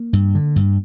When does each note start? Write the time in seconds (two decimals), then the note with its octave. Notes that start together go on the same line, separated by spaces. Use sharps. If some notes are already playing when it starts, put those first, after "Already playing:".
Already playing: A#3
0.13 G2
0.35 D3
0.56 G2